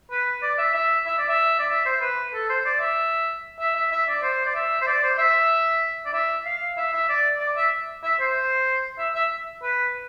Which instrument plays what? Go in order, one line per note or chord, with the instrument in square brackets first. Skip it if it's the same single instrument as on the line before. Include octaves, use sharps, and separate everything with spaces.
[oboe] B4
D5
E5
E5
E5
D5
E5
D5
E5
C5
B4
A4
C5
D5
E5
E5
E5
E5
D5
C5
D5
E5
C5
D5
C5
E5
D5
E5
F5
E5
E5
D5
D5
E5
E5
C5
E5
E5
B4